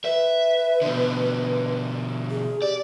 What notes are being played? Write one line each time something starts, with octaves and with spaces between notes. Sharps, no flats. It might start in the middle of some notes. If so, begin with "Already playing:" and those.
B4 E5
B2 D3
G#4
G4 D5